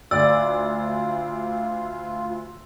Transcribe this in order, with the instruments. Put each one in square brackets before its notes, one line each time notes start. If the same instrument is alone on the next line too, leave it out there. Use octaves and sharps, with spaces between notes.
[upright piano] D2 [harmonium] F4 [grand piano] D5 [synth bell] E6